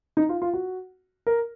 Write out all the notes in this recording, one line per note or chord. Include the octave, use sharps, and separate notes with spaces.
D#4
F4
F4
F#4
A#4